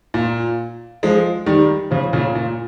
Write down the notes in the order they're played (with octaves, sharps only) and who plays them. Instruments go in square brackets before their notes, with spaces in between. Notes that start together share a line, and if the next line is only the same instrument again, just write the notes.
[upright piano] A#2
F3 G#3
D#3 G3
C#3 F3
A#2 C#3
A#2